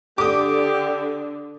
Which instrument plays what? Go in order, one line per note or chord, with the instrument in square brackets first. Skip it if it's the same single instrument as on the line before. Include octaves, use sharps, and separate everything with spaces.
[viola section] D3 [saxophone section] G4 [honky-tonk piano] D6 D#6